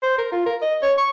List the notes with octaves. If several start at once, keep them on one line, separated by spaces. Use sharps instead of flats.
C5
A#4
F4
A#4
D#5
C#5
C#6